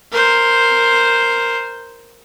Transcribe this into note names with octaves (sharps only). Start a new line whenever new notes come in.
A#4 C5